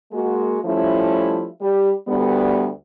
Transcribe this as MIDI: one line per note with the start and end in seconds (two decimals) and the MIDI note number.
0.12 0.58 56
0.12 0.58 58
0.12 0.58 66
0.64 1.46 53
0.64 1.46 55
0.64 1.46 57
0.64 1.46 61
0.64 1.46 64
1.61 1.92 55
1.61 1.92 67
2.06 2.69 38
2.06 2.69 55
2.06 2.69 59